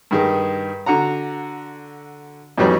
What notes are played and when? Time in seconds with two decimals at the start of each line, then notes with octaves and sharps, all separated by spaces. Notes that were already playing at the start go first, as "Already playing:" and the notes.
0.11 G2 D#3 G#4
0.86 D3 F#4 F#5 A#5
2.57 F2 E3 F#3 G3 C#4 D#4